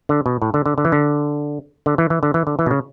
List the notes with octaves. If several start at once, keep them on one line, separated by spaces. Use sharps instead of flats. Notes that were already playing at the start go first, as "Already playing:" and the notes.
D3
B2
A2
D3
D3
D3
E3
D3
D3
E3
E3
D3
E3
D3
E3
B2
C#3